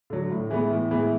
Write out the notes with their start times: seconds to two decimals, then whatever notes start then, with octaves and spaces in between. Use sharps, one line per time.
0.10 D3 F#3
0.30 A2
0.51 E3 G#3 B3
0.71 A2
0.91 E3 G#3 B3